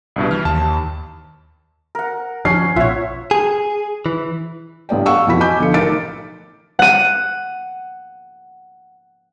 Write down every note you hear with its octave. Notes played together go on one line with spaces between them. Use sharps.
C2 G2 B2
E3 F6
D#2 A5
A#4 F#5
F3 C#4 C7
A#1 B2 F4 C#5 E5 F#5
G#4
E3
A1 G2 B3 D5 G5
F5 F#5 C#6 E6
F2 B2 E3 F#4 B5 B6
D#5 G#5 B5 D6 G6
B1 D3 F3 C#7
A1 D#4 A#4 D6 A6 D7
F#5 D#7